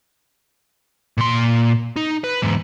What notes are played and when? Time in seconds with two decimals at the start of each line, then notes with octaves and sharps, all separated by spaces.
1.18 A#2 C6
1.96 D#4
2.24 B4
2.42 E2 G#2